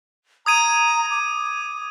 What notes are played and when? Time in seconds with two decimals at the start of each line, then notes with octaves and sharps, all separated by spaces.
0.46 A#5 D#6 G#6 D#7
1.11 D6